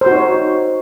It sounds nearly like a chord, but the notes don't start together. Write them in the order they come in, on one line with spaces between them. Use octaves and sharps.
C5 F#4 D#4 C#5